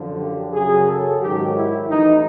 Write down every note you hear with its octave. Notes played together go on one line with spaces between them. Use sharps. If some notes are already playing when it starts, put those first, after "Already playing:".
Already playing: F#2 D3 F3
G4
F#2 C#3 F#3 G#4
A4
G#2 D#3 F#3 G4
E4
A1 A2 E3 D#4